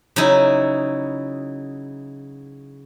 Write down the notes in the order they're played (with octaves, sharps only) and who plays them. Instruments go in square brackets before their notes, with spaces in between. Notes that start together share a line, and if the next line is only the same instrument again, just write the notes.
[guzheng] C#3 F#3 D#4 E4